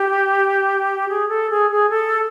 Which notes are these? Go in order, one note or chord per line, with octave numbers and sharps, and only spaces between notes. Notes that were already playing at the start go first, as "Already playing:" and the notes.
Already playing: G4
G#4
A4
G#4
G#4
A4